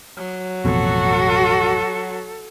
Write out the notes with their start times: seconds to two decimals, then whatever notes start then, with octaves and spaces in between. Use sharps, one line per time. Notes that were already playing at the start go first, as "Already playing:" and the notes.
0.18 F#3
0.65 A1 F2 B2 F#4 A4